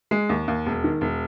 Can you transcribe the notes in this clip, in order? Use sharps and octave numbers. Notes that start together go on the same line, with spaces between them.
G#3
D#2
D#2
E1
D#3
E1